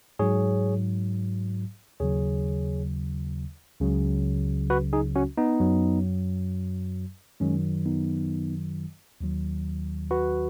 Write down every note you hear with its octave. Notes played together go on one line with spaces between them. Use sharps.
G#2 F#3 G#4 C#5
D#2 C#3 F#3 G#4 C#5
C#2 C#3 F#3
F#4 B4
D#4 G#4
C#4 F#4
B3 D#4
F#2 F#3
F#2 D#3 F#3 G#3 C#4
B3 D#4
D#2 D#3 F#3
F#4 B4